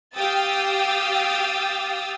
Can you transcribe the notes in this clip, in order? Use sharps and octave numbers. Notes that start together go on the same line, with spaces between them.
G4 F5 G5 D#6 E6 A6